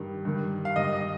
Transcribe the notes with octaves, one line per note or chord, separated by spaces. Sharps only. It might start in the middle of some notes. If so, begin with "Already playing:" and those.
Already playing: G2 D#3
G2 D#3
F5
G2 D#3 D#5
D#5